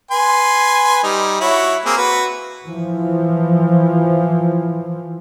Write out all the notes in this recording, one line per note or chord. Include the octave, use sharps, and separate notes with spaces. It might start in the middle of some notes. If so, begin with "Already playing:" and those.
B4 G#5 C6
G3 D#4
E4 F#4 C#5
A#3 C4 G#4
F#4 B4
E3 F3